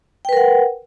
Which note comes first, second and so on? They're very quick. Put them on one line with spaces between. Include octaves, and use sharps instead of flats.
G5 B4 A#4 F#5